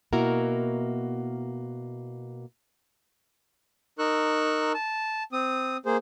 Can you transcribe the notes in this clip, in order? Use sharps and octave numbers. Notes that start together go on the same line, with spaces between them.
B2 A#3 E4 F#4 A#4
D#4 A#4 C#6 E6 F#6
A5
C4 D#6
A#3 G#4 C5